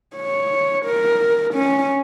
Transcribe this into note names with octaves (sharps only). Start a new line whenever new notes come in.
C#5
A#4
C#4